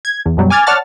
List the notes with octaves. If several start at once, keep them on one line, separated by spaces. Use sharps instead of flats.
G#6
E2
F#2 B2 F#3 G3
G#5 D6 F6 G#6 A6
C#5 D5 F#5 A5 F6 A6